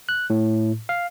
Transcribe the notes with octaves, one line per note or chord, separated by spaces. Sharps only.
F#6
A2
F5